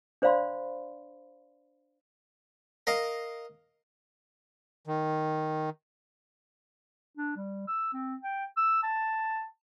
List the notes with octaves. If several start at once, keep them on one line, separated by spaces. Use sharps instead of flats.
D4 C5 D5 F5 B5 C6
A#4 D#5 F5
D#3
D4
G3
E6
C4
G5
E6
A5